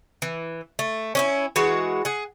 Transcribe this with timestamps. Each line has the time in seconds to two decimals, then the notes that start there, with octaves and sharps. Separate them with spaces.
0.22 E3
0.79 A3
1.15 C#4 D#4 E4
1.56 E3 G#3 F#4
2.05 G#4 F#5